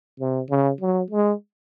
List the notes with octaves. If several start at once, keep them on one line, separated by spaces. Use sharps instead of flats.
C3
C#3
F#3
G#3